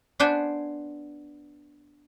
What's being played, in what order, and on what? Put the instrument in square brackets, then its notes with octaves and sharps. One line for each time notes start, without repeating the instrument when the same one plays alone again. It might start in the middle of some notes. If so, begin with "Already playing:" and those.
[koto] B3 D4 C5 G#5